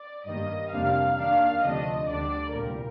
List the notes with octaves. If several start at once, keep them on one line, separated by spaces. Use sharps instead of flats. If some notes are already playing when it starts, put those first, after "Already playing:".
Already playing: D5
G2 D#3 G3 A#3 D#5
F2 C3 G3 A#3 D4 F5
D#2 D#3 A#3 D4 F5
D2 C3 F3 A3 D4 D#5
D2 D3 G3 D4 D5
C2 A#2 G3 A#4